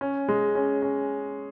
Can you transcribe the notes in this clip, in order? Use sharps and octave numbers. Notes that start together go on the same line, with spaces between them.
C#4
G#3
C#4
C#4